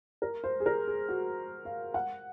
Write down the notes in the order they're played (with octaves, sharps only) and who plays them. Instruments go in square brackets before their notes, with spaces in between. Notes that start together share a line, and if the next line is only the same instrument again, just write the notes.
[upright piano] A#4
C5
G#4
A#4
G#4
F#4
F5
F#5